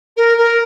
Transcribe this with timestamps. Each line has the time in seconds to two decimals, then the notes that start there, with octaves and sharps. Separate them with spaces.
0.16 A#4
0.37 A#4